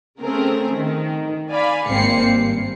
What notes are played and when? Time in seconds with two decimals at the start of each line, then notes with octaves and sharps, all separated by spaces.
0.21 C#3 A3 C4 G#4 A#4
0.74 D#3
1.50 D5 F5 G#5 B5
1.88 G#1 G#2 A#3 C4 C7 C#7
2.27 G2